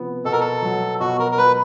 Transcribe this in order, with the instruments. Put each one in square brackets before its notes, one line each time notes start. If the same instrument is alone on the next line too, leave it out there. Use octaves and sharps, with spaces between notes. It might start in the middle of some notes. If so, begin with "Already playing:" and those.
Already playing: [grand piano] C3 F3 B3
[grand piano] B2 [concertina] A4
[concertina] A#4
A4
[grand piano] F#3
[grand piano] B2 [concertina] F#4
[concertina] A#4
A#4
[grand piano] F#3 [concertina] B4